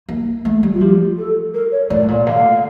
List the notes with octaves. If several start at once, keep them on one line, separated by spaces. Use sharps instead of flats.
A#3
A3
G3
F4
F3 G4
A4
A#4
C#5
A2 D5
A#2
D3 F5